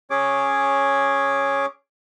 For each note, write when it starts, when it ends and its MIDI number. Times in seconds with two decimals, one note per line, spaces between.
0.10 1.66 61
0.10 1.66 68
0.10 1.66 73
0.10 1.66 86